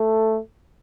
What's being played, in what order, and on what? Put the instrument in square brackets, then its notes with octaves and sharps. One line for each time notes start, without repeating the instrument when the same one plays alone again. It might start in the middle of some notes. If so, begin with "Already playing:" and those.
Already playing: [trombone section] A3 A4